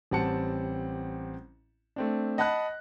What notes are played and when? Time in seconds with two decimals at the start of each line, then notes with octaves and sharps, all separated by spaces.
0.11 A1 G3 C4 F#5 A5 C#7
1.96 A3 C4 D4
2.38 D#5 F#5 A5 B5 F#6